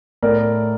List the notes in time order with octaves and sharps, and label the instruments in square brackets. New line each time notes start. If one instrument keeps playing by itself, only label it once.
[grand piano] A2 A#4 D5